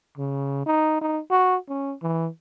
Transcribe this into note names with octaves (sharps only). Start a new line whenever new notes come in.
C#3
D#4
D#4
F#4
C#4
E3